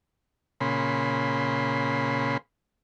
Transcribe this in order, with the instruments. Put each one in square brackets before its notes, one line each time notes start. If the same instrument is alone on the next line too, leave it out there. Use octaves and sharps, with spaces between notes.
[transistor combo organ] A#2 C#3 B5 C6